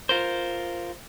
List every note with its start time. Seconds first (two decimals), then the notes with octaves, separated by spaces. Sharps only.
0.09 F4 A#4 C5